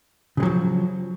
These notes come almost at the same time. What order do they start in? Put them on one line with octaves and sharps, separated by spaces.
C#3 G#3 F#3 F3